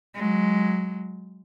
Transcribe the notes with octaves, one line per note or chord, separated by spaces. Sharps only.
F#3 G#3